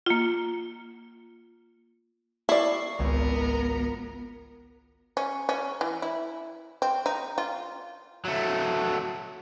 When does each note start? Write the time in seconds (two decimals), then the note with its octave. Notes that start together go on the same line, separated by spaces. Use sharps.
0.06 A#3 F4
2.49 E4 D5 C#6 C7
2.99 G#1 C#2 B3 A#4
5.17 C#4
5.49 C#4
5.81 E3
6.02 E4
6.82 C4
7.06 D#4
7.38 F4
8.25 F#3 A3